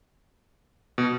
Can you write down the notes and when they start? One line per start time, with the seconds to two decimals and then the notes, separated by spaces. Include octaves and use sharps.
0.98 B2